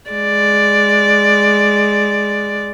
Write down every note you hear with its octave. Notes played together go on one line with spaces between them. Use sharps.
G#3 D5